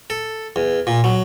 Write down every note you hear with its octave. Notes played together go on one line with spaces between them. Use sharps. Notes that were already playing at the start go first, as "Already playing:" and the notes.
A4
E2
A#2
F#3